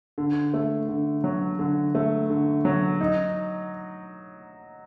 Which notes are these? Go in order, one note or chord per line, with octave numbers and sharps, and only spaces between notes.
D3
A3
D3
F#3
D3
A3
D3
F#3
D#4